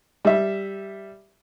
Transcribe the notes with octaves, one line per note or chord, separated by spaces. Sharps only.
G3 E5